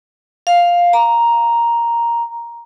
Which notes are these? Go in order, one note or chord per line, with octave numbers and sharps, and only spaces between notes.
F5
A#5